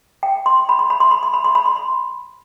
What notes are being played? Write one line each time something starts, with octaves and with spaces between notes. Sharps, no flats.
G5
C6
B5
C6
B5
C6
B5
C6
B5
C6
B5
C6
B5